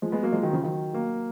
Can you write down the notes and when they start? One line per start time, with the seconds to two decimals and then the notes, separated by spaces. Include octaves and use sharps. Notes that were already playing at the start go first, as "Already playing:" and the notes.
0.02 F3 G#3
0.12 G#3 B3
0.23 F#3 A#3
0.32 F3 G#3
0.43 D#3 F#3
0.53 C#3 F3
0.64 D#3 F#3
0.93 F#3 A#3